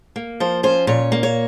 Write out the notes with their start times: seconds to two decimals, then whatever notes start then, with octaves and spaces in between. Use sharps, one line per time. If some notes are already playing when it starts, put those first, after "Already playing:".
0.16 A#3
0.40 F3 C5
0.63 C#4 C5
0.87 A#2 C#5
1.12 A#3
1.23 C#5